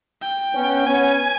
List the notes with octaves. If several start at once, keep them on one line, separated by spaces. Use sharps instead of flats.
G5
B3 C#4
B3 C#4 G#5